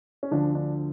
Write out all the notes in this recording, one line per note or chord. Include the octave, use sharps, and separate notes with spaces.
C#4
D2 D3 F3 D4
D4